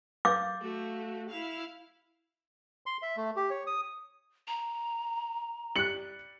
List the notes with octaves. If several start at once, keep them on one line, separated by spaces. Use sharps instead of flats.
F5 D6 G6 A6
A3 F#4
E4 F5
C6
E5
A3
G4
C#5
D#6
A#5
G3 F#6 C#7 F#7